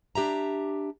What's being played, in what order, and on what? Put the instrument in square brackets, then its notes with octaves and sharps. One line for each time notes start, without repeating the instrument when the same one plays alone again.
[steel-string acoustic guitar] D4 G4 E5 A#5